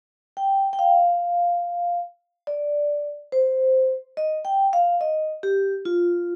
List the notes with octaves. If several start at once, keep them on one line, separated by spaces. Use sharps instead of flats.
G5
G5
F5
D5
C5
D#5
G5
F5
D#5
G4
F4